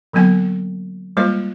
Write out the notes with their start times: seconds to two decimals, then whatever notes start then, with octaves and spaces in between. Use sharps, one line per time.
0.13 D3 F#3 A#3 B3 G#5
1.17 G3 G#3 A#3 F4 C5